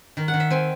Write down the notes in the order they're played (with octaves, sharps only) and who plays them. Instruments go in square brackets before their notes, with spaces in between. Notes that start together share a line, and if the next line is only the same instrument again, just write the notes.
[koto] D#3
F#5
D#3
E5
C4 G#5